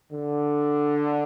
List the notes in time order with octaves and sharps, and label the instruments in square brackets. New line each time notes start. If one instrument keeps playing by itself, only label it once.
[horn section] D3